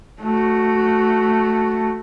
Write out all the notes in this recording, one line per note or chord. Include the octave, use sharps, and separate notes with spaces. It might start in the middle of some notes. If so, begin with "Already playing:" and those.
A3 F#4